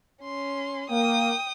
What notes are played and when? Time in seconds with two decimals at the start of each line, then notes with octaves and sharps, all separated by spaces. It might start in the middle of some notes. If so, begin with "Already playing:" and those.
0.23 C#4 C6
0.90 A#3 G5 D#6